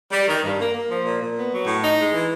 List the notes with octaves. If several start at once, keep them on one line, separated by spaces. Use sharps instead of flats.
G3
D#3
G2
A#3
A#3
F3
A#2
A#2
B3
F#3
A2
D#4
G#3
E3